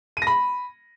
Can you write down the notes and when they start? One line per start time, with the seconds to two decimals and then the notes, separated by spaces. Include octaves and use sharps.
0.17 D#7
0.22 A#6
0.27 B5